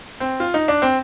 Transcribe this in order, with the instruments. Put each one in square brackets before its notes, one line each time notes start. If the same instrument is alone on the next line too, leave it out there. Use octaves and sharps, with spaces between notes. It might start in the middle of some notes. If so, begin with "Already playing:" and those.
[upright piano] C4
F4
D#4
D4
C4